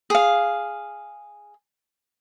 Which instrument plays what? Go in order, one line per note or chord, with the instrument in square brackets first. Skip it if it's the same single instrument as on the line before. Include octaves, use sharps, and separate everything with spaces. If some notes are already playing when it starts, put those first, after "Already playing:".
[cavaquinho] G#4 F5